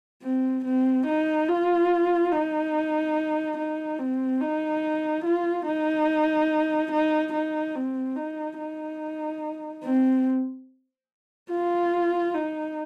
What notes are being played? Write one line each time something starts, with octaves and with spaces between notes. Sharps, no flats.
C4
C4
D#4
F4
D#4
D#4
C4
D#4
F4
D#4
D#4
D#4
C4
D#4
D#4
C4
F4
D#4